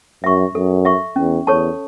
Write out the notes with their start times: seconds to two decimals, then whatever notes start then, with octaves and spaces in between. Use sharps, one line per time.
0.24 F#2 E5 C#6
0.54 F#2 A4
0.85 E5 C#6
1.16 E2 C#4
1.47 E2 A4 C#5 A5 C#6